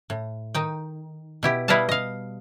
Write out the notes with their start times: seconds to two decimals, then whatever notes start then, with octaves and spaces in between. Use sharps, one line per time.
0.10 A2
0.54 D#3 D#4 G5
1.43 B2 E4 G4
1.68 G3 E4 B4 D#5 F5 A5
1.89 D#5 F5